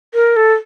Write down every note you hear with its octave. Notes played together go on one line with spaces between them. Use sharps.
A#4
A4